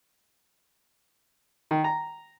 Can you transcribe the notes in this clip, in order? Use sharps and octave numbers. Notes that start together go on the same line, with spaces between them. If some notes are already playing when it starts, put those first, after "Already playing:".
D#3
A#5